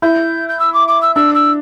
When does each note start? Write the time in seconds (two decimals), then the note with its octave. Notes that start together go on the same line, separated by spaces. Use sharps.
0.02 E4 G6
0.48 G6
0.59 E6
0.73 D6
0.88 D6
1.02 E6
1.15 D4 E6
1.34 E6